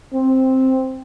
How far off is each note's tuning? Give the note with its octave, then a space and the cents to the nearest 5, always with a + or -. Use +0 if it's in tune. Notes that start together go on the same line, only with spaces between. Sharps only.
C4 +0